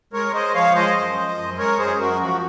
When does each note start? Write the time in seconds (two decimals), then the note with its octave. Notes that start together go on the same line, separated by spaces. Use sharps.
0.13 G#3 A#4 C#5
0.34 G#3 C5 D#5
0.54 F3 C#5 F5
0.75 G#3 C5 D#5
0.96 F#2
1.17 F3
1.38 F#2
1.58 G#3 A#4 C#5
1.79 F#2 G#4 C5
1.99 F#2 F#4 A#4
2.21 F3 F#4